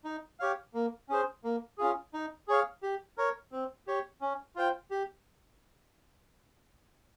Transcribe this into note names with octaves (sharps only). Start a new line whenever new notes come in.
D#4
G4 C#5 F5
A#3
C#4 G#4 C5
A#3
C#4 F4 G#4
D#4
G#4 C#5 F5
G4
A#4 C#5
C4
G4 C#5
C#4
F4 C5 G5
G4